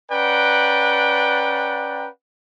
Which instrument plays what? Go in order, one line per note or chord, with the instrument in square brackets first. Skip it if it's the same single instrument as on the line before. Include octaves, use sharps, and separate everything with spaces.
[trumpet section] C#4 B4 D5 F#5 G5 A#5